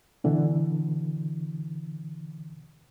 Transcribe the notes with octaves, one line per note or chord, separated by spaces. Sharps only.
B2 D3 E3